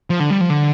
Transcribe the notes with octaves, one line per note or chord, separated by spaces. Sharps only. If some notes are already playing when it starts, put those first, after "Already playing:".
F3
D3
G3
F3
D3